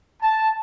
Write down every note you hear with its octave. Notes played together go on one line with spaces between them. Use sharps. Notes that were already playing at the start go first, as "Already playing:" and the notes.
A5